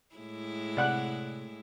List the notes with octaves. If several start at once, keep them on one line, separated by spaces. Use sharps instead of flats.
A2 G#3 E4
C3 D5 F#5 F#6